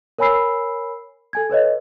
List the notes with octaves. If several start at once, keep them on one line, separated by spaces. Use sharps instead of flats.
A#4 C#5 G#5 B5 E6 C7
A4 G#5 G#6
A4 B4 C#5 D#5